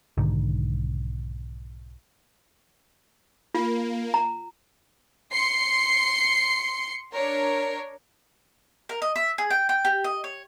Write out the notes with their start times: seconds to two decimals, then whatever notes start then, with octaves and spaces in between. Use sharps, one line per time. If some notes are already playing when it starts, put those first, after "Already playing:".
0.18 B1 G#2 D3 D#3
3.54 A#3 F4
4.14 A#5
5.32 C6 C7 C#7
7.13 D4 A#4 C#5
8.89 A#4
9.02 D#5
9.16 E5
9.38 G#4
9.50 G5
9.69 G5
9.85 G4
10.04 D#5
10.24 C#5